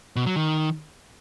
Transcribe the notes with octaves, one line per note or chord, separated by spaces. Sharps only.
B2
F#3
D#3